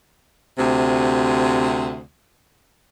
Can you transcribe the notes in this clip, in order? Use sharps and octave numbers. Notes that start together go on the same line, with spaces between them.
D2 C3